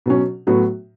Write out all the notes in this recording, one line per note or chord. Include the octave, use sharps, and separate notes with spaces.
B2 F#3 C#4
A2 F#3 B3 F#4